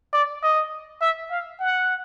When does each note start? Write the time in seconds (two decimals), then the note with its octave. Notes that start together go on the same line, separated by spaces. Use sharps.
0.13 D5
0.43 D#5
1.01 E5
1.31 F5
1.60 F#5